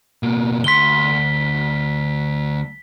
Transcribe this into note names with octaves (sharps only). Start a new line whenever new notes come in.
B2 A#3
D2 C6 B6 G7